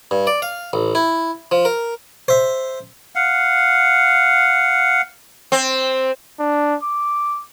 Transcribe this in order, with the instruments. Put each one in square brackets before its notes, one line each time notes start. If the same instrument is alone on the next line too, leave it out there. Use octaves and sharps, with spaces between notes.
[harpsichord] G2
D5
F5
A1
E4
F3
A#4
C5 E5
[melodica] F5 F#5
[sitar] C4
[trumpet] D4
D6